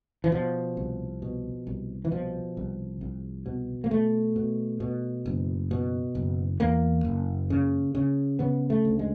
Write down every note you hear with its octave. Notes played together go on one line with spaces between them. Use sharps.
E3
B2 F3
C2
B2
C2
E3
B2 F3
C2
C2
B2
A#3
B2 A3
B2
B2
F#1
B2
F#1
E2 A#3
F#1
C#3
C#3
C#3 B3
A3
D2
G#3